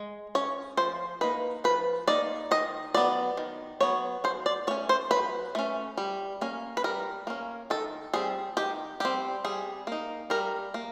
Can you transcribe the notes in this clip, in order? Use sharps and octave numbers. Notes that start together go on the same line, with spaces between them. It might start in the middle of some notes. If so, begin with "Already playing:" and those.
Already playing: G#3
C#4 C#5
F3 C5
A#3 D#4 B4
F3 B4
A#3 D#4 D5
D#3 D#5
F#3 B3 D5
D#3
F#3 B3 C#5
F#3 C5
D5
A3 C#4 C#5
C5
F#3 B4
A3 C#4
G3
A#3 C#4
B4
G3 A#4
A#3 C#4
D#3 A4
G3 C4 G#4
D#3 G4
G3 C4 G4
G3 G#4
A#3 D#4
G3 A#4
A#3